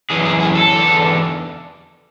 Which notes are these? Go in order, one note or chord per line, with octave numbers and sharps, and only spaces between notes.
F#2 E3 G#4
G#4
G#4
A4
E2 D3